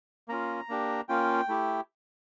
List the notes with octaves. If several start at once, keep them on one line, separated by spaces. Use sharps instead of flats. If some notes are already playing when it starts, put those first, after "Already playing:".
A#3 C#4 F4 A#5
A#3 D4 G4
A#3 C#4 F4 G5
A3 E4 G4